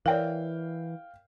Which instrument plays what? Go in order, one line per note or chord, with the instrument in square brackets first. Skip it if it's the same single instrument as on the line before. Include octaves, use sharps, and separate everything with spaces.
[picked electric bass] E3 [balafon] A#4 C#5 D5 [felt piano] F5 G5